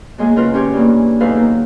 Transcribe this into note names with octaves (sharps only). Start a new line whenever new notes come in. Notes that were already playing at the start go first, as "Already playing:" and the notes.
F#3 G#3 A#3 G#4
C#3 F4 A#4 B4
C#4 F4 G4 C#5
G2 E3 A#3
G#2 B2 F#3 A4 B4 F5
D#3 A#3